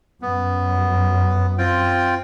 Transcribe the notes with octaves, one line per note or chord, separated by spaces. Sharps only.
F#2 B3
C4 F4 G5